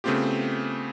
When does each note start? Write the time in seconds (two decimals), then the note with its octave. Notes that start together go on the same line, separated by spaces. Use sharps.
0.04 C#3 A3 B3 C4 F4 G4